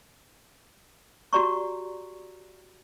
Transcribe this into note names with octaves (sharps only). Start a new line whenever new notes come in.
F#4 G4 D5 A#5 C#6